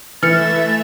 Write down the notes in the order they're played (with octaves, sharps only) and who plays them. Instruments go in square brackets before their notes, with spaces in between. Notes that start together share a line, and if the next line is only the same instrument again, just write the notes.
[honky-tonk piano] E3 [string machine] A3 E5 [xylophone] F6 C#7 [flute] A6